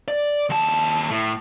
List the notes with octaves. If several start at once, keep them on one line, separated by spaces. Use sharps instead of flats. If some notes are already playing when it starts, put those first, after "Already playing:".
D5
D#2 A5
A2